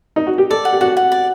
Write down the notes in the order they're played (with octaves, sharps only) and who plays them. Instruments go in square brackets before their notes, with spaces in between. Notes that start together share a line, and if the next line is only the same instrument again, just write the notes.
[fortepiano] D#4
F#4
G4
[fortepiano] A4 [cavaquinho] D5
[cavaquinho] F#5
[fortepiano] G4
[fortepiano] F#4 [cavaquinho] F#5
[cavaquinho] F#5
D5